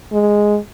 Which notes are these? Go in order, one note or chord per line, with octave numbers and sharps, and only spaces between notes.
G#3